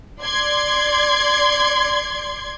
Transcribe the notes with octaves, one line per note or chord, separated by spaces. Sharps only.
D5 C6 G#6